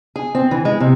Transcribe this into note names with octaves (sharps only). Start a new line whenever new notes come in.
G#4
C4
E3
G#3
C3